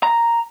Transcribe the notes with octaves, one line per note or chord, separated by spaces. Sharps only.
A#5